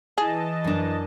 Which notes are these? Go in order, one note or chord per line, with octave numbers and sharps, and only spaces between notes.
E3 G#4 D#5 A5
F#2 D4